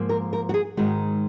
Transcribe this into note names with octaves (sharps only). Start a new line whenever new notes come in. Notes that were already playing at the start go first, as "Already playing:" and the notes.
Already playing: G#2 F3 A#3
A#4
A#4
F#4
G#4
G#2 D#3 G#3 F#4